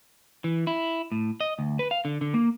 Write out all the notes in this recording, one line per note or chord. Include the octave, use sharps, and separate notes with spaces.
E3
E4
A2
D#5
D2
B4
F5
D3
D3
A#3